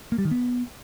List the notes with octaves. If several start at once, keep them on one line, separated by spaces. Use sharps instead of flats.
A#3
G3
D#3
B3